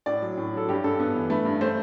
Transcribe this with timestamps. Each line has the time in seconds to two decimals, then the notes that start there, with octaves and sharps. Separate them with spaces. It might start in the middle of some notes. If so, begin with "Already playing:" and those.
0.06 A2 D5
0.22 F#3
0.37 A2
0.53 F#3 A4
0.69 G2 G4
0.84 G2 A4
1.00 B3
1.15 E3
1.30 A3 B4
1.45 G2
1.61 A3 C5